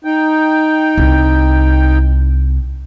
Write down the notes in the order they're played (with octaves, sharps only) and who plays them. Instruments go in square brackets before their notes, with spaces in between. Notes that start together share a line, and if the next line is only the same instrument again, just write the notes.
[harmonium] D#4 G5
[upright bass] C2